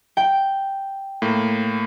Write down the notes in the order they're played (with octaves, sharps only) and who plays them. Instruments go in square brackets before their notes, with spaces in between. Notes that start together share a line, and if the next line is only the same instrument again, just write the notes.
[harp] G5
[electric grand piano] A2 A#3